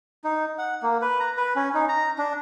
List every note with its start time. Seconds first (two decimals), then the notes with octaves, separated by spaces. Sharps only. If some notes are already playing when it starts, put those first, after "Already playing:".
0.24 D#4
0.58 F#5
0.83 A#3
1.02 B4
1.20 A#5
1.37 B4
1.56 C#4
1.74 D#4
1.89 A#5
2.18 D4